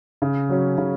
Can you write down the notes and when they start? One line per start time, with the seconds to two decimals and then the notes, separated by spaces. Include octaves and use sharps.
0.22 C#3
0.49 F#3 C#4
0.78 C#3